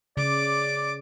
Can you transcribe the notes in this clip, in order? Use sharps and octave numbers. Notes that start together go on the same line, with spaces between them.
C#3 D5 D6